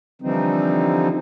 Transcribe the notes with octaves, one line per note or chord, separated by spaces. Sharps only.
D3 E3 F3 G3 C4 D#4